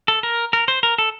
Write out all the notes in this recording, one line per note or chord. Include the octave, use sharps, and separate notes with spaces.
A4
A#4
A#4
C5
A#4
A4